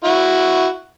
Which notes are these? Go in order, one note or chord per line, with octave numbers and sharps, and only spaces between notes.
E4 F#4